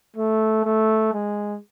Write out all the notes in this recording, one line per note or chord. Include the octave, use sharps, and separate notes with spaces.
A3
A3
G#3